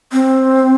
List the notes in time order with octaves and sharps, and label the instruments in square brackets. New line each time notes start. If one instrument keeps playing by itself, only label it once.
[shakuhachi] C4